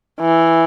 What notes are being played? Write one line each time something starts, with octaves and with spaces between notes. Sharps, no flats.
E3